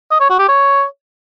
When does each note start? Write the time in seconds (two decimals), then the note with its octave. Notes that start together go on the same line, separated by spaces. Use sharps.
0.11 D#5
0.20 C#5
0.30 F#4
0.39 G4
0.48 C#5